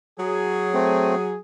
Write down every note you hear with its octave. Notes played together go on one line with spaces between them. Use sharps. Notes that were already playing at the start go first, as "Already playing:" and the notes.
F#3 G#4
A3 C4